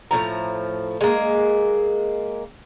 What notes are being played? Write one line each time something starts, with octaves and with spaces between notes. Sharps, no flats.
A2 C#3 F3 A#5
G#3 A#3